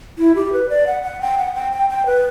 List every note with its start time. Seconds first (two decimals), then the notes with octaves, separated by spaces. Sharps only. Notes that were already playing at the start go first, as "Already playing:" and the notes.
0.18 E4
0.35 G4
0.53 B4
0.69 D5
0.87 F#5
1.03 F#5
1.21 G5
1.38 F#5
1.55 G5
1.72 G5
1.89 G5
2.06 B4